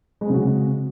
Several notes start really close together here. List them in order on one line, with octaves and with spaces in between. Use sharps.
G#3 C4 C#3 F#4